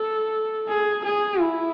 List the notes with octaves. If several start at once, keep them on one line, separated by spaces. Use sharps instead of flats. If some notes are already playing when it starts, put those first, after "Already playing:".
Already playing: A4
G#4
G#4
E4